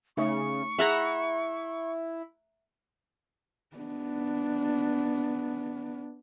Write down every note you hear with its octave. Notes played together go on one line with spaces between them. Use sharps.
C#3 A3 D#4 E5 C#6
E4 G#4 E5 F#5 A#5
B3 D4